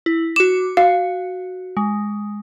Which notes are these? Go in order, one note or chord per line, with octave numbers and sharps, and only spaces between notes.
E4
F#4 D6 E7
F#4 F5
G#3